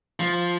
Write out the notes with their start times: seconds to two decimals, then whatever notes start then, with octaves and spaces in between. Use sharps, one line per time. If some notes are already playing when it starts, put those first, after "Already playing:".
0.20 F3